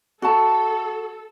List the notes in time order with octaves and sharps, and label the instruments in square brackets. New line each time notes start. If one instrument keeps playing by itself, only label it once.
[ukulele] F#4 A5 [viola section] A4